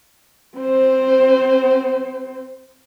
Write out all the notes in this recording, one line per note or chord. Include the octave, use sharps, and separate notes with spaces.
C4 C5